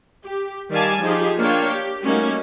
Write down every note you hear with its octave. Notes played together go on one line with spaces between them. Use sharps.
G4
D#3 G3 D5 F5 G#5 A5
F3 D#4 F4 G4 G#4
A#3 D4 F4 C#5 F5 G5
G4
G3 A3 A#3 C#4 D#4 F#4